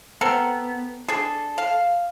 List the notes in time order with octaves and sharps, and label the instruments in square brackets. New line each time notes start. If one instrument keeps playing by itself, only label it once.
[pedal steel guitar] B3 [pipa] C4 A4 A#4
[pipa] D4 G#4 [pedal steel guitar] A4
[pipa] F5